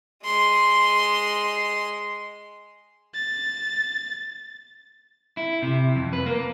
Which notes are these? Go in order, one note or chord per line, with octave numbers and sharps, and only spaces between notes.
G#3 C6
A6
E4
C3
F2
B4
A#3